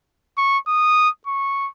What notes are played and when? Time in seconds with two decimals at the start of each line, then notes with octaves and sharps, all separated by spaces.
0.38 C#6
0.68 D#6
1.27 C#6